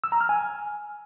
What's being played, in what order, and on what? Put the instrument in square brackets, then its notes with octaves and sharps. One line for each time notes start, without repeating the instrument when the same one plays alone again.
[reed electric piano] E6
A#5
F6
G#5